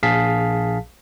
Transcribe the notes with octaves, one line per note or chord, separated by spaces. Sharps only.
A#1 G#4 F5 A5 B6